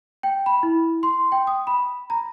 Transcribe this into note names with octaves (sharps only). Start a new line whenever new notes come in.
G5
B5
E4
C6
G5
D#6
B5
A#5